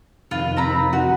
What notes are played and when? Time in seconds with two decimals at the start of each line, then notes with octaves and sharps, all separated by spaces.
0.31 F2 C3 D#3 F4 B4
0.57 C4 A#5 B5
0.93 D#4 F#4